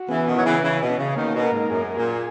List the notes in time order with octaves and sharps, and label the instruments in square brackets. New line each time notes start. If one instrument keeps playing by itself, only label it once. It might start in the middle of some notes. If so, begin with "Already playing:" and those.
Already playing: [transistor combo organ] F#4
[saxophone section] C#3 E3 [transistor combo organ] B3
[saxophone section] B2 D#3
[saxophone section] F#3 [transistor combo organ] E4
[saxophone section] C#3 E3
[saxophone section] C#3 E3 [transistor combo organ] C#4
[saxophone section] B2
[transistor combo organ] C#4
[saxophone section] C#3
[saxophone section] B2 D#3 [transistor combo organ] A#3
[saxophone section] B2
[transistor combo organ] A#4
[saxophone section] G#2
[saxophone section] F#2 [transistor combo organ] G#4
[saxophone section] A#2 [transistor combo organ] G#4